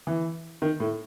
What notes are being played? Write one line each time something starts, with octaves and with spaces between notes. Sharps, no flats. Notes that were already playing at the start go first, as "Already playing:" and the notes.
E3
D#3
A2